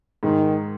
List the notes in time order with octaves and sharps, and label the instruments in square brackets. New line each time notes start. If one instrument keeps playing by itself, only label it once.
[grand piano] G#2 [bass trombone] D#3